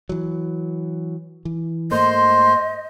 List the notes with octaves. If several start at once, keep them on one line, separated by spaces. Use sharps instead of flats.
E3 F#3
E3
G#2 A3 A#3 C5 D#5 C6